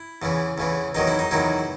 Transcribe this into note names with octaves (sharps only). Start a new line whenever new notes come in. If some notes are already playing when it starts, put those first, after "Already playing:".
Already playing: E4
E2 C#3 E3
E2 C#3 E3
E2 D#3 F#3 D#4
E4
D#4
E2 D#3 F#3 E4